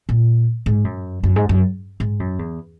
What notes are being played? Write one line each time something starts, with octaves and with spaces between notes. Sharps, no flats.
A#2
G#2
F#2
F#2
G#2
F#2
G#2
F#2
E2